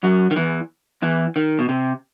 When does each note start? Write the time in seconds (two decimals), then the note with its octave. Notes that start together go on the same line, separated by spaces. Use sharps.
0.03 F#2 F#3
0.31 D#3
0.36 E2 E3
1.02 E2 E3
1.36 D#3
1.59 B2
1.69 C3